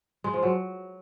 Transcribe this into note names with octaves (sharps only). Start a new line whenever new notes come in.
G#3
F3
F#3